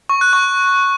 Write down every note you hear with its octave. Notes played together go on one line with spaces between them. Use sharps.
C#6
F#6
C#6